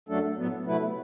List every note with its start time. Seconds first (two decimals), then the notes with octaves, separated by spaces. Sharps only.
0.09 F#2 F#3 A3 D4 A4
0.37 A2 F#3 B3
0.65 C3 F#3 A3 E4 B4